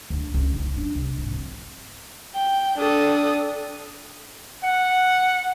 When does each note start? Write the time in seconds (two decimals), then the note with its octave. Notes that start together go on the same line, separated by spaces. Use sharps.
0.10 D2
0.34 C#2
0.55 D#4
0.77 D4
0.95 C2
1.18 G#1
1.32 C4
2.35 G5
2.79 D4 A4 D#6
4.64 F#5